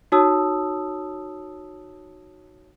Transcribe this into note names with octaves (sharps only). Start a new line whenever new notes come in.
D#4 F#4 C#5 A5 D#6 E6